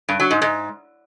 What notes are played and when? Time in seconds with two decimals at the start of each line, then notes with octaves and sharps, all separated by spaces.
0.09 G2
0.20 F#3
0.31 G#2
0.42 G#2